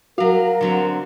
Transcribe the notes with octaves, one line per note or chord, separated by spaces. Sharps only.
F#3 F#4 A#4 F5
D3 F#3 C4